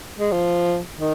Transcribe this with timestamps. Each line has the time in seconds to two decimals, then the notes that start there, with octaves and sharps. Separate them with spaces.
0.19 G#3
0.32 F3
0.98 D#3